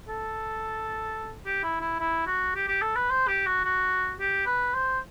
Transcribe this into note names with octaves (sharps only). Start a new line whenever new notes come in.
A4
G4
E4
E4
E4
F#4
G4
G4
A4
B4
C5
G4
F#4
F#4
G4
B4
C5